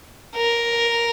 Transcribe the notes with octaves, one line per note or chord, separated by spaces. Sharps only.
A#4